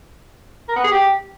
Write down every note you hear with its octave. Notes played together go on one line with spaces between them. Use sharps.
A#4
B3
G#4
G4